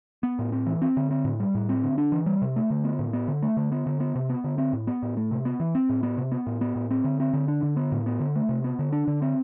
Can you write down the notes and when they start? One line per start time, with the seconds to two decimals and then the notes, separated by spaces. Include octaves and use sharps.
0.23 B3
0.39 A2
0.52 C4
0.67 E3
0.82 C4
0.97 D3
1.11 C4
1.25 A2
1.40 G3
1.55 A2
1.69 C4
1.83 D3
1.98 D4
2.12 E3
2.26 G3
2.42 C3
2.56 A3
2.70 D3
2.84 B3
2.99 A2
3.13 B3
3.28 D3
3.42 A3
3.57 D3
3.72 B3
3.87 D3
4.00 B3
4.15 C3
4.29 B3
4.44 D3
4.58 C4
4.73 A2
4.87 B3
5.02 A2
5.17 A3
5.31 C3
5.45 B3
5.60 E3
5.75 C4
5.89 A2
6.03 B3
6.17 C3
6.32 B3
6.47 A2
6.61 B3
6.76 A2
6.91 C4
7.04 D3
7.20 C4
7.34 D3
7.48 D4
7.63 D3
7.77 B3
7.92 A2
8.06 B3
8.20 D3
8.36 A3
8.49 C3
8.64 B3
8.79 D3
8.92 D4
9.07 D3
9.22 C4